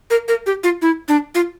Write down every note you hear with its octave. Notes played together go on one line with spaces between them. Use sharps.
A#4
A#4
G4
F4
E4
D4
F4